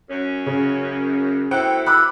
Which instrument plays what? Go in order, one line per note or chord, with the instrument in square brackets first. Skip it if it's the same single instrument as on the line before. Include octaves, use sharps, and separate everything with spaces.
[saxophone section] F#2 C#4
[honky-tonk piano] C#3
[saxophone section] B2 A3 E4 [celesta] C5 [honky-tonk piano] G5 F#6 C#7
[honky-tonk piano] B5 D6 [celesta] E6 F#6